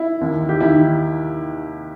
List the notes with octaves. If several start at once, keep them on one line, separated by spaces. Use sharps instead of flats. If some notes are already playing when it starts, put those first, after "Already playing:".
Already playing: E4
D#2 D#3
G4
D#2 D#3 E4